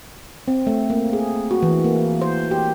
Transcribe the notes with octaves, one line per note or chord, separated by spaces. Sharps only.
C4
A3
A#3
G#4
F#4
E3
A#3
C5
G4